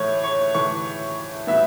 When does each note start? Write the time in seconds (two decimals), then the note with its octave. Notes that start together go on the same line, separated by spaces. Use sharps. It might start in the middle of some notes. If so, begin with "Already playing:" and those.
Already playing: A2 E3 A3 C#5
0.24 C#5
0.54 A2 E3 A3 C#6
1.47 A2 F#3 B3 E5